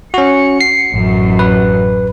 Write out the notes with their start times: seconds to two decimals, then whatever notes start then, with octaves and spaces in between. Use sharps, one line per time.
0.14 C#4 F#4 C#7
0.61 C7
0.91 A1 F#2
1.39 B4